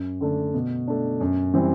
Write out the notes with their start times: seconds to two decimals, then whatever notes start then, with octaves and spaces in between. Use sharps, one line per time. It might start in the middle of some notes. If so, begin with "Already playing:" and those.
Already playing: F#2
0.21 D3 A3 D4
0.54 B2
0.87 A3 D4
1.21 F#2
1.54 E3 G3 C4